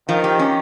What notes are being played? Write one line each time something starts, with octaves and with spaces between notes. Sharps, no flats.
D#3 F3
G4
C#4